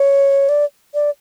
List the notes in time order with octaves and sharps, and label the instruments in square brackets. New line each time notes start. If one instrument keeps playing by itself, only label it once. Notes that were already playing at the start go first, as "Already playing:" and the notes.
Already playing: [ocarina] C#5
D5
D5